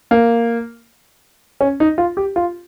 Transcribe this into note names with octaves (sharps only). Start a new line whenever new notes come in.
A#3
C#4
D#4
F4
G4
F4